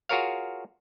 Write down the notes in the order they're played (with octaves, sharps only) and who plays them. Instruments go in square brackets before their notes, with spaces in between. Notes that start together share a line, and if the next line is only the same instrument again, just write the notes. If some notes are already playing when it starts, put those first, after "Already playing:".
[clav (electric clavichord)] F4 F#4 G#4 A#4 C#5 F5